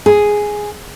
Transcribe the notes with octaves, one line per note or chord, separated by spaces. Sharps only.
G#4